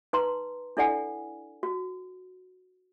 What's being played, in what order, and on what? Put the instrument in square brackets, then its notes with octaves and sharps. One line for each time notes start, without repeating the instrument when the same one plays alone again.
[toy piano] D#4 B4 A#5 C6
D4 E4 A4 D5 F#5 G#5
F#4